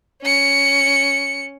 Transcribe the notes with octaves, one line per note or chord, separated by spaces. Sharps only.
C#4 C#7